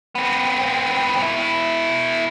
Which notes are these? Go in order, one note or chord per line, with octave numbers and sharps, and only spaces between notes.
B3 C4
B2 E4